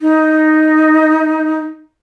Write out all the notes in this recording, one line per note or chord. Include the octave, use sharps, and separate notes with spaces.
D#4